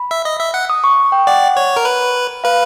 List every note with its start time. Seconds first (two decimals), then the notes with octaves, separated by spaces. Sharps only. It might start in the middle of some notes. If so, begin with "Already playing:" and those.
Already playing: B5
0.11 E5
0.25 D#5
0.40 E5
0.54 F#5
0.70 D#6
0.84 C#6
1.12 G5
1.27 D5 F#5
1.57 C#5
1.76 A#4
1.85 B4
2.44 B4 F5